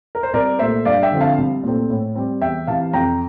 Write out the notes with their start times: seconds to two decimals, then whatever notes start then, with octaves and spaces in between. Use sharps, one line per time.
0.15 A#4
0.23 C5
0.33 C2 A#4 D5
0.59 A#2 A3 C5 E5
0.85 G2 D5 F5
1.02 E5 G5
1.12 D3 F3 C4
1.21 F5 A5
1.38 C2
1.63 A#2 A3 C4
1.90 A2
2.16 G3 C4
2.41 E2 E5 G5
2.67 C3 E3 F5 A5
2.93 F2 G5 A#5